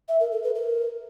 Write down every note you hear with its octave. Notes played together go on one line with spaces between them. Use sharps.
E5
A#4
A4
B4
A#4